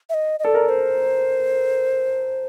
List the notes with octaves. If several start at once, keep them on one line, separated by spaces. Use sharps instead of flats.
E5
D#5
D#5
A4 D5
A#4
C5